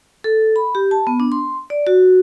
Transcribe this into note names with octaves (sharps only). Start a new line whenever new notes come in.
A4
B5
G4
A5
B3
D4
C6
D5
F#4